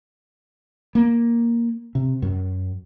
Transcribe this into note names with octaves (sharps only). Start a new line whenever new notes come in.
A#3
C3
F#2